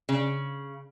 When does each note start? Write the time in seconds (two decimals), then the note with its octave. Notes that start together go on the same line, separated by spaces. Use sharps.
0.09 C#3